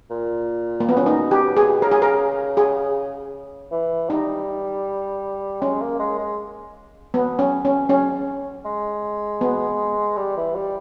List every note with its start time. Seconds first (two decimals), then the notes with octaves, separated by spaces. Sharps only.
0.11 A#2
0.80 A#3
0.89 B3
0.97 C#4
1.05 B2 D#4
1.31 G4
1.43 B2
1.57 G#4
1.82 C#3 A#4
1.91 G#4
2.02 A#4
2.57 G#4
3.72 E3
4.10 G3 D#4
5.61 G#3 C#4
5.81 A#3
5.99 G#3
6.18 G#3
7.14 B3
7.39 C#4
7.65 C#4
7.89 C#4
8.65 G#3
9.41 B3
10.17 G3
10.37 E3
10.56 G3